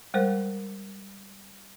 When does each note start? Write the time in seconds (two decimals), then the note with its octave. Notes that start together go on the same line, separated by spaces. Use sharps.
0.14 G3 G#3 A#4 C5